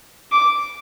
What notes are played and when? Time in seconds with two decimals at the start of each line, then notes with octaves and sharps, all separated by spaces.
0.32 D6